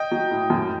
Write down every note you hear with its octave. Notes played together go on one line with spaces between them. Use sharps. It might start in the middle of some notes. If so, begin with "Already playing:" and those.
Already playing: D#5 G5
F#3
A2
F#2